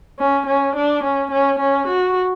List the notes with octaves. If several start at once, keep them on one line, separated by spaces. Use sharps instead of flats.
C#4
C#4
D4
C#4
C#4
C#4
F#4